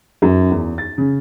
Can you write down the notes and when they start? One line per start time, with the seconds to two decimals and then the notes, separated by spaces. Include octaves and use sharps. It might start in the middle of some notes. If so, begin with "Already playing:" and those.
0.22 F#2
0.51 E2
0.78 A6
0.98 C#3